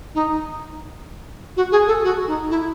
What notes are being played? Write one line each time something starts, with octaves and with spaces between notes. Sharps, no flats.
D#4
F#4
G#4
A4
F#4
D#4
E4